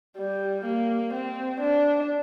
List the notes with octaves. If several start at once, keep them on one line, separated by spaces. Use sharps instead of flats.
G3
A#3
C4
D4